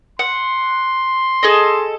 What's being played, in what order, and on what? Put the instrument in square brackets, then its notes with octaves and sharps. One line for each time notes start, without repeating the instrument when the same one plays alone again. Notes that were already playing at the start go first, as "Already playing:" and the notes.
[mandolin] F#5 [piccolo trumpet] C6
[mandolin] G#4 A4 D#5